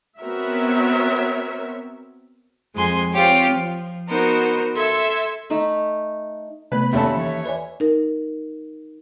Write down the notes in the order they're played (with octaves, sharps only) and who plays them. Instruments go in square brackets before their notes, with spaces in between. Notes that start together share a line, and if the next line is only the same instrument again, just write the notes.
[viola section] B3 C4 F#4 A#4 C#5 E5
[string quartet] F2 G#3 G#5 C6
C4 F4 G4 C#5
F3
B3 D#4 F#4 A#4 C5
A4 E5 C6 G#6
[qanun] A3 D#4 B5
[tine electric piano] C3 A3 B3 [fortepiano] B4 [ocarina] B5
[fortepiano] D#2 C#4 A4 [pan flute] E5
[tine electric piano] E3 [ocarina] C#5
[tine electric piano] B4 D5 G#5
[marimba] D#4 A#4